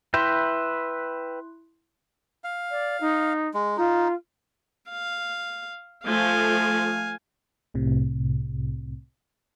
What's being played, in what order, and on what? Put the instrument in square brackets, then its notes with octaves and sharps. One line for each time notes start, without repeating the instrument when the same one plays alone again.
[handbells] E4 C6 F#6 [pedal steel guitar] B4 E5 G5
[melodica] F5
[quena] D5
D#4
[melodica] G#3
[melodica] D#4 [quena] F4
[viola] F5
[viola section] F3 A3 [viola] F5 G#5
[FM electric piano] C2 A2 C3